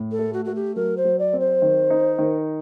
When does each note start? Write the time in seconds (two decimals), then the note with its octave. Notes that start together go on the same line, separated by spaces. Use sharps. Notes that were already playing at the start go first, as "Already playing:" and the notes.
Already playing: A2
0.12 A4
0.19 A3
0.33 F#4
0.45 A3 F#4
0.55 G4
0.76 F#3 A#4
0.97 C5
1.05 F#3
1.19 D5
1.33 C4
1.40 C5
1.62 D#3
1.90 D#4
2.19 D#3